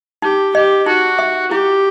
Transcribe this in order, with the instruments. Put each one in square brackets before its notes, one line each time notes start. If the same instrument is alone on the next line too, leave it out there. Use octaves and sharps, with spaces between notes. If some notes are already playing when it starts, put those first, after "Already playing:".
[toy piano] D#4 [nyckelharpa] G4
[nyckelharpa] G4 [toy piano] D#5
[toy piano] D#4 [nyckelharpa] F#4
[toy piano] E5
[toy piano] E4 [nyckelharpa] G4